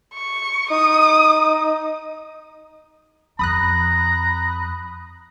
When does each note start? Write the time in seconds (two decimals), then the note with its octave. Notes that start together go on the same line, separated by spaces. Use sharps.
0.14 C#6
0.71 D#4 D#6
3.39 F2 A#5 B5 D#6 F#6